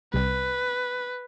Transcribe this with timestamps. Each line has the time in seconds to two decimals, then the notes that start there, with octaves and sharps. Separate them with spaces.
0.13 C2 C3 G3 C4 B4